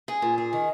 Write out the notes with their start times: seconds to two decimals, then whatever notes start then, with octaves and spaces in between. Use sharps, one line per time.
0.08 G#4
0.22 A#2
0.38 G#4
0.53 D#3 D#5